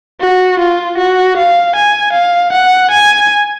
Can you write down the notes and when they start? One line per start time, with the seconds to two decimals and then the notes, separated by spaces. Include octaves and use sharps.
0.20 F#4
0.59 F4
0.98 F#4
1.37 F5
1.75 G#5
2.13 F5
2.52 F#5
2.91 G#5